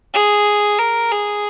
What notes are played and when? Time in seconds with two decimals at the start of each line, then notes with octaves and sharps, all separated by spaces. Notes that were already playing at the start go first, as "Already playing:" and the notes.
0.14 G#4
0.79 A#4
1.12 G#4